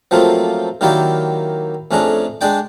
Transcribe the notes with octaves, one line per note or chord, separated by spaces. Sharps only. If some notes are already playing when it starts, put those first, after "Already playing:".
F3 F#3 A3 A#3 C4 F4
D#3 F#3 A#3 E4 G4 D5
F2 A3 C#4 D4 G#4 A#5
G#3 D4 D5 G5 D6